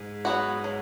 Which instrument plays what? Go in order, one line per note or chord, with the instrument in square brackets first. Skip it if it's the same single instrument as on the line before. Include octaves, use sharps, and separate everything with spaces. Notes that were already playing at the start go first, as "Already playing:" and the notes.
Already playing: [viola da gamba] G#2
[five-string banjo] F#3 B3 F#4
F#3